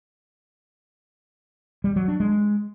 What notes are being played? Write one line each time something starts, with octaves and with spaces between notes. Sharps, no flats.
G3
F#3
D4
G#3